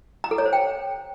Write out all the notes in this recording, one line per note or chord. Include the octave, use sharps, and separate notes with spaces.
A#5
A4
C#5
C5
G5